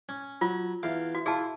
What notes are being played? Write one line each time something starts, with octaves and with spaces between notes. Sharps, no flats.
C#4
F#3 F4
E2 F5 D6
F#4
E4 F4 G#4 A5